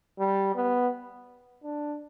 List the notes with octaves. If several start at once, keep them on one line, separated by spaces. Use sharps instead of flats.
G3
B3
D4